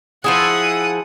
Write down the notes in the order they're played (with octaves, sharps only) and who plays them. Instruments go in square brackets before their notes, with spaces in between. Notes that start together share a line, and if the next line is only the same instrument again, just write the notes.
[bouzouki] F3 E4 G#4 [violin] F#5 D#6